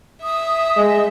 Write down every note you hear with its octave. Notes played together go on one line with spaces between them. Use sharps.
E5 D#6
G#3 D#5